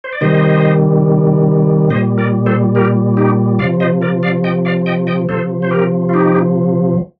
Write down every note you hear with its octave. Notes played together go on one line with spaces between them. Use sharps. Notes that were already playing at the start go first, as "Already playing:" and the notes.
C5
D5
C3 D#3 G3 C5 D#5
A#2 G3 C5 D#5
A#4 D5
A4 C5
G4 A#4
D#4 G4
C3 F3 D5 F5
C5 D#5
A#4 D5
D5 F5
D#5 G5
D5 F5
D#5 G5
D#5 G5
C3 F3 A4 C5
C5
G4 A#4
F4
D#4 G4